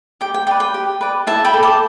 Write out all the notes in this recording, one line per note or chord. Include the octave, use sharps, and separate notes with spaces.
G4 G5
G5
B4 D5 G5
G5
G4
B4 D5
E4 E5 A5
G5 B5
A4 D5
A5 D6